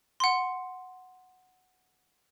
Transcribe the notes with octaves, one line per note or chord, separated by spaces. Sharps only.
F#5 C6